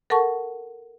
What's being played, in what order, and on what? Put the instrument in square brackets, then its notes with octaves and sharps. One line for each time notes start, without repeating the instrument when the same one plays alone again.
[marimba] A4 A#4 F#5 A5 C#6